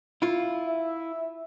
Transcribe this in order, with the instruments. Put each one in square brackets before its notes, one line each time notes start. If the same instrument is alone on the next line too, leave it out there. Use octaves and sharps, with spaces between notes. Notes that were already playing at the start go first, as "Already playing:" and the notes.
[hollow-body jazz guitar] E4 F4
[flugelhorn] E5